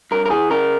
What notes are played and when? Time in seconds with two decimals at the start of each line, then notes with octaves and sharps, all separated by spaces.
0.11 G2 A#4
0.26 A#4
0.30 E3 G#4
0.50 C#3 A#4